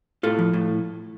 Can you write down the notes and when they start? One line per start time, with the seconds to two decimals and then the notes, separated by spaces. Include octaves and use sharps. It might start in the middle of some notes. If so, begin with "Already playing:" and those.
0.23 A2 F4 A4
0.39 F3
0.53 A2